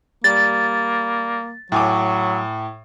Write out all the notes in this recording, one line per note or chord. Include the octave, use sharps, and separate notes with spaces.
G3 A#3 A6
A2 F#3 G#5 D6